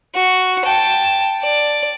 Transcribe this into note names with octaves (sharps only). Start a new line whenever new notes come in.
F#4
G5 A5
D5